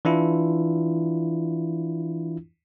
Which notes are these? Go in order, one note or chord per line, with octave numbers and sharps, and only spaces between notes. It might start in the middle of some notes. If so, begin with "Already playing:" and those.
E3 D4 E4 F4